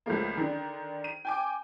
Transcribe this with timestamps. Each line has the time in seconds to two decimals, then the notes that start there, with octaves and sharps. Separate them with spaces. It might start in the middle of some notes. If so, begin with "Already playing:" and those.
0.06 C#2 F3 A3 A#3
0.37 D3 D#3
1.04 D#7
1.25 G5 G#5 D6